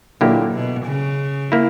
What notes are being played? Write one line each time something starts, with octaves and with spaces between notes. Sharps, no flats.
A#2 D3 F#3 A#3 E4 G4
B2
C#3
A#3 E4